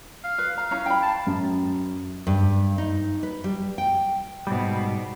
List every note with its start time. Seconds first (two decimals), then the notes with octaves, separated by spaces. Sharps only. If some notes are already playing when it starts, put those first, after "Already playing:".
0.24 F5
0.38 B4
0.58 F5 A#5
0.71 C#4 E4 A#5
0.86 G5 B5
1.02 A5
1.27 F#2
2.27 G2
2.78 D#4
3.23 B4
3.44 G3
3.78 G5
4.47 G#2 B2 G3